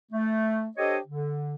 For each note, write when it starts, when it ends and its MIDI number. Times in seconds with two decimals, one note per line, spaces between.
0.12 0.66 57
0.77 0.97 62
0.77 0.97 67
0.77 0.97 69
0.77 0.97 72
0.77 0.97 73
0.77 0.97 75
1.06 1.55 50